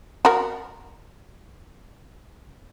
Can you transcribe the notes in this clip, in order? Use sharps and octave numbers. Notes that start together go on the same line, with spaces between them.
F#4 A#4